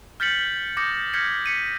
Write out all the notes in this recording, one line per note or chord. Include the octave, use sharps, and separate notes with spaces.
F6 G6 A6 B6 C#7 F#7
D6 D#6 G6 A#6 C#7
F6 G6 G#6 A#6 B6 C#7
B6 C#7 D#7